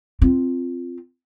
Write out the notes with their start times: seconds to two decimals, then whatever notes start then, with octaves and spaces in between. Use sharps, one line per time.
0.22 C4 F4